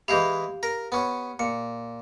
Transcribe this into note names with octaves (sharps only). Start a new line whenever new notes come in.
E3 G#3 E4 G4 F5 G6
A#4 A#6
B3 C#4
A#2 C#7